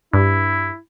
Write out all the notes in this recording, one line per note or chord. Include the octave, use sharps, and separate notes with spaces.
G2 E4